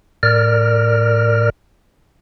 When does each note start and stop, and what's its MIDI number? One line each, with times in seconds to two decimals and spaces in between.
0.23 1.50 45
0.23 1.50 70
0.23 1.50 74
0.23 1.50 89